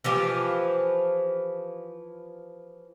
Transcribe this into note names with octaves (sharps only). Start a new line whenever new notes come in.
E3 F3 G4